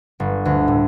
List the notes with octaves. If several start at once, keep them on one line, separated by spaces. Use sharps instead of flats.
G1
D2
A2